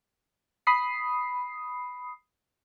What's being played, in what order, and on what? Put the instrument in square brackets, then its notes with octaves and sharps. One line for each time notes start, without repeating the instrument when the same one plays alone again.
[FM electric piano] B5 D#6 C7